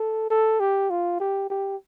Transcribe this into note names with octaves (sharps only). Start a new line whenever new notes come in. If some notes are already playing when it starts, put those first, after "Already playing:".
Already playing: A4
A4
G4
F4
G4
G4